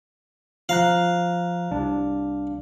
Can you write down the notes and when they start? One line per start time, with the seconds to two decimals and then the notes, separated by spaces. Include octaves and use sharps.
0.69 F3 F5 A#5 F#6
1.71 C2 D4